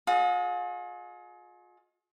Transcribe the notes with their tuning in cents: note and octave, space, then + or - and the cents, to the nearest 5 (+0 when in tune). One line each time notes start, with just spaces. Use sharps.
F4 +45 G#4 +30 D#5 +0